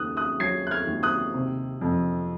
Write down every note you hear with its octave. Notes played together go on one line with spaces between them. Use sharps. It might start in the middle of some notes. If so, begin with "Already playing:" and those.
Already playing: D#2 C#3 D#6 F#6
D#6 F#6
F#3 G#6 C7
F#6
F6 G#6
D#2
D#6 F#6
C3
F2